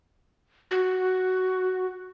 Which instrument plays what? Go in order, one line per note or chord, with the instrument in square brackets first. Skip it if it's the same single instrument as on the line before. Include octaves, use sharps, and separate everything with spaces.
[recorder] F#4